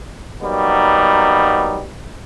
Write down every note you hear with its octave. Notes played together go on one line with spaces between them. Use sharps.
F#3 G3 A#3 B3 D#4